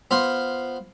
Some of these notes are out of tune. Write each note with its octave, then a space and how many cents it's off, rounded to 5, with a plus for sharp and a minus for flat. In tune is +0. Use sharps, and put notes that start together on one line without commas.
B3 +0 F4 +0 C5 +0